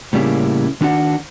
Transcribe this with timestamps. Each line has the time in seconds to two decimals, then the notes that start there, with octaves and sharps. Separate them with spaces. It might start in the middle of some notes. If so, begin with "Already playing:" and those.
0.13 A2 C#3 G3 A#3 C#4 E4
0.81 D#3 D4 F#4 F#5